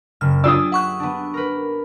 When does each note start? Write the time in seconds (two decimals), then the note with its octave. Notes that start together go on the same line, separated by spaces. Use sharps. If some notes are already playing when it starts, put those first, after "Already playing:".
0.21 F#1 F6
0.44 D4 F4 G4 G#4 D5 D#6 E6
0.72 E5 F#5 C#6 F#6
1.00 B3 D4
1.34 A#4 B4